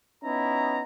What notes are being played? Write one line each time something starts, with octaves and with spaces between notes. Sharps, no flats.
B3 C#4 D#4 E4 A#5